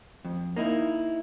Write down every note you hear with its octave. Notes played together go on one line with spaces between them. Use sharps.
F2
A#3 D#4 E4